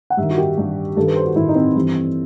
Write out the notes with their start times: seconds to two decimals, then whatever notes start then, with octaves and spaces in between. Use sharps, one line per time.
0.10 F#5
0.17 G2 D#3 E5
0.30 F#4
0.38 G4
0.58 G2 D#3
0.97 G2 A4
1.00 D#3
1.06 B4
1.16 C5
1.26 F#4
1.36 G2 D#3 E4
1.49 D#4
1.55 C4
1.76 G2 E3